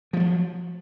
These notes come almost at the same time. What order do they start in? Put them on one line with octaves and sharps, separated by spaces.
F3 G#3 F#3